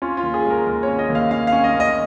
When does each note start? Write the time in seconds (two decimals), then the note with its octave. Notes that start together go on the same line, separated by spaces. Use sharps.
0.02 C#4 F4
0.17 F4
0.23 D#2
0.34 G#4
0.45 G#3
0.50 A#4
0.66 D#2 A#4
0.83 C#4 C#5
0.99 D#5
1.09 D#2
1.15 F5
1.31 C#4 F5
1.47 C#4 F5
1.64 D#5
1.74 D#2
1.80 D#5